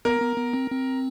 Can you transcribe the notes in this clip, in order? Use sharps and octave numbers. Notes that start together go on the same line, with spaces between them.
B3 A#4
B3
B3
C4
C4